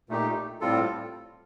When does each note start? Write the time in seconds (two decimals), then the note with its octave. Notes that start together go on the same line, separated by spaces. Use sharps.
0.09 A#2 A3 D#4 G4
0.61 A2 G3 C4 F4 A4